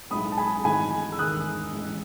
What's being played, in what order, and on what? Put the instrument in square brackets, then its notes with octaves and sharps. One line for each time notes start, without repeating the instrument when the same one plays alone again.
[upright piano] B1 A2 G#3 B5 D#6
A5
G#5 B5
G#1 G#2 E3 A3 G#5 B5
E6
E1 D#2 D#3 G#3 D#6 F#6
A1 A2 G#3